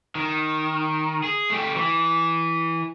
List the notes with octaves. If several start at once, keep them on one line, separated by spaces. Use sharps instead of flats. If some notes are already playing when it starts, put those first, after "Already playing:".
D#3
G#4
A3 G4
E3